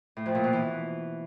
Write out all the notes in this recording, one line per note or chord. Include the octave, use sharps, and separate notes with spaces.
A2
F2
A#2
B2
E3